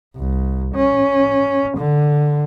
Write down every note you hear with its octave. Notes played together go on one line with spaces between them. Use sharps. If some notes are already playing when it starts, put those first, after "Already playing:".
C2
C#4
D3